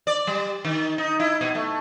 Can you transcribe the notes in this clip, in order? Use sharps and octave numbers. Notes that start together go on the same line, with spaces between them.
D5
G3
D#3
D#4
E4
B2
A3